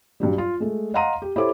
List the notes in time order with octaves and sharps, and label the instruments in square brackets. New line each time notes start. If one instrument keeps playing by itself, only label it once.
[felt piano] G2 F#3 G3
F4
G#3 A3
D#5 F5 F#5 A#5 C6 D#7
G4
E4 G4 A4 C5 C#5 D6